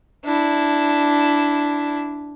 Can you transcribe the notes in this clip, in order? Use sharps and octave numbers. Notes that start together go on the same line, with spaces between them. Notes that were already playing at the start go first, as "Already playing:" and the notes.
D4 E4